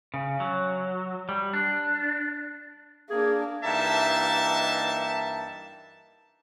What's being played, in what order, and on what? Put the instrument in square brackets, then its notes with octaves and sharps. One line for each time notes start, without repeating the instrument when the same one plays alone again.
[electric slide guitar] C#3
F#3
G3
D4
[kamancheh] A#3 D4 [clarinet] G#4
[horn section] G2 E3 A#3 D#4 E5 A5